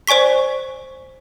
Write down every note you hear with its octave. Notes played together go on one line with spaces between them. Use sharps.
C5 D5 G#5 C#6 B6